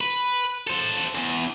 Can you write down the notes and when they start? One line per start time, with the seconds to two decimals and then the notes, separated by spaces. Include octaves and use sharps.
0.01 B4
0.67 A4 C5
1.15 E2